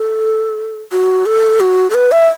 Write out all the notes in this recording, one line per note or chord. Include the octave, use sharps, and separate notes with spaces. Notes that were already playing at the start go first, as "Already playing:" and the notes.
Already playing: A4
F#4
A4
F#4
A4
B4
E5